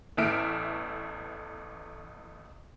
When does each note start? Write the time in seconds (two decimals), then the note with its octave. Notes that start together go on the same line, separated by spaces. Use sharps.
0.17 A1 E2 A3 E5 F6 D7